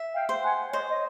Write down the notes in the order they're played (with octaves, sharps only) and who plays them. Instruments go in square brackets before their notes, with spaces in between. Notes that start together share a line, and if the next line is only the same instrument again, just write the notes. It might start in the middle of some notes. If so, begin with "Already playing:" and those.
Already playing: [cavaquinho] E5
[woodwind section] F5 G5
[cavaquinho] C5
[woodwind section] F#5 G#5
[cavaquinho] C5 [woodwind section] C#5 D#5
[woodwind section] D#5